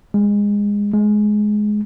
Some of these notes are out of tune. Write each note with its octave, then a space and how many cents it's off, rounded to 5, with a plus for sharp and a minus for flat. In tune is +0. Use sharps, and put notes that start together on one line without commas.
G#3 -20
G#3 +15